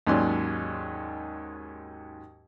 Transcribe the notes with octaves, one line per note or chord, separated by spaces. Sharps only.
D#2 G#2 F#3 C#4 D5 C6